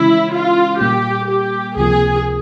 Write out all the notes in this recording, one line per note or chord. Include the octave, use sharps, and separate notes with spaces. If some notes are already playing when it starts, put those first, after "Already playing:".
Already playing: C#3 E3 G#3 C#4 E4
F4
A#2 G3 A#3 G4
G4
C#2 C3 F3 A#3 G#4